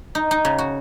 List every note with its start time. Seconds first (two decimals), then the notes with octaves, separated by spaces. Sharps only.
0.15 D#4
0.31 D#4
0.45 C#3
0.58 F#4